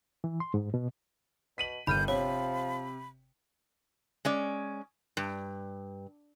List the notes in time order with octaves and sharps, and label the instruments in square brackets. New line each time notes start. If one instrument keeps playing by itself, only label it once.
[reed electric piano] E3
C6
G#2
B2
[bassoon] B2 [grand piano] B6 D#7 F#7
[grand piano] G1 [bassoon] D#2 [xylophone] B5 F6 D#7 [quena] G6
[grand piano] C3 [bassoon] F3 [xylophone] C#5 [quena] B5
[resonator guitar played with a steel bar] G#3 C#4 D5
G2